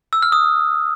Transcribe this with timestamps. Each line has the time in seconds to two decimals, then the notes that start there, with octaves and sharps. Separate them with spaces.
0.13 E6
0.22 F6
0.32 D#6